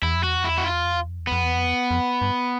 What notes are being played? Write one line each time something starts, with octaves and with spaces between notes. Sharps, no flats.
E2 E4
F2
E2 F#4
F2
E4
E2
F#4
F2 F4
E2
F2
E2
F2
E2
F2 B3
E2
F2
E2
F2
G2